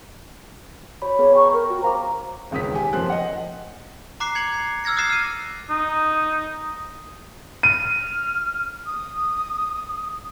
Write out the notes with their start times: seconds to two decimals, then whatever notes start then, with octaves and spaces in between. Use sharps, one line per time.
1.02 F#4 C#5 B5
1.19 B3 G#4 B4 C#5
1.35 G5 A#5 C#6
1.53 A#4
1.70 F#4
1.82 C5 F5 A#5 D6
2.51 E1 C#2 D#3 D#6 B6
2.75 G4 G#5
2.93 F1 F#2 F3 A#3 C5 F#6
3.10 D#5 F#5
4.20 A#5 D6 F#6 C7
4.35 G#6 C#7 F7 F#7
4.54 C7
4.84 E6 F6 G#6 A#6 C#7
4.96 D6 D#6 F#6 A6 C7 E7
5.10 F6 D#7
5.70 D#4
7.63 F6 D#7
8.86 D#6